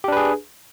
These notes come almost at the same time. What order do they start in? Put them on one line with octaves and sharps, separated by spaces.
G4 D4 B4 G#4